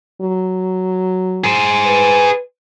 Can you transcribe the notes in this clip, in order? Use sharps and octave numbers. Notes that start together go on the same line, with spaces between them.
F#3
G#4 C5
B4